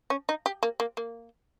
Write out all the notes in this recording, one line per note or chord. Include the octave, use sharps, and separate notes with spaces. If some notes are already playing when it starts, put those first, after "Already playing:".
C#4
D#4
G4
A#3
A#3
A#3